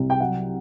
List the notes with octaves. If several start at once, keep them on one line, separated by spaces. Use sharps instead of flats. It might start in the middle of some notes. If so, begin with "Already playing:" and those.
Already playing: C2
G5
F#3 F#5